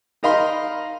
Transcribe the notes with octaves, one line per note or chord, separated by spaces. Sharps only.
D#4 A#4 D#5 F5 B5 C6